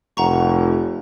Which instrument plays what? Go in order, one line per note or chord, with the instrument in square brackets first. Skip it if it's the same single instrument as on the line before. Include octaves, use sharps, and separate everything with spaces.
[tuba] F1 [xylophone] F#5 A#5 C#6